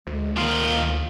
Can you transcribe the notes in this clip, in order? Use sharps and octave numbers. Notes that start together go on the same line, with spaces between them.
D2 G#3
D#3 A#3 F4